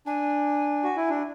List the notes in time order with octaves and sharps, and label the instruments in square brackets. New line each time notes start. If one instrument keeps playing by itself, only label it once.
[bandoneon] D4 [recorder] G#5
[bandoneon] F#4
E4
D4